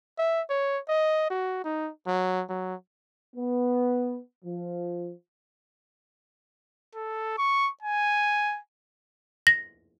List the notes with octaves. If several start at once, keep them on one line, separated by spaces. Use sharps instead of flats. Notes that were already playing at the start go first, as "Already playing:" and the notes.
E5
C#5
D#5
F#4
D#4
F#3
F#3
B3
F3
A4
C#6
G#5
A#6